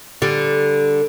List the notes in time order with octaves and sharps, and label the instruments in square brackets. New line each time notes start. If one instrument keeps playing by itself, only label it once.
[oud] D3 G3